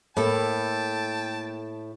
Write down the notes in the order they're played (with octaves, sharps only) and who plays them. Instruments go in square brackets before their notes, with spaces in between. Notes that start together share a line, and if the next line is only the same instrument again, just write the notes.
[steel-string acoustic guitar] A2 [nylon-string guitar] A#3 A4 [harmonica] G5 A5